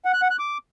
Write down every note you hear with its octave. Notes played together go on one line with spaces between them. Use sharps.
F#5
F#6
F#5
F#6
D6